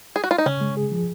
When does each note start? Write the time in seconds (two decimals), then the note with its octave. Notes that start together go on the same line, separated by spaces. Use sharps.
0.16 G#4
0.24 F#4
0.31 F4
0.38 D#4
0.46 C#3 C#4
0.61 G#3
0.77 G#4
0.92 F3